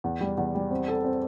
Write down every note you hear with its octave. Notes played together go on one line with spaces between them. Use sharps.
E2
G3
E2
G3
C4
A4
C4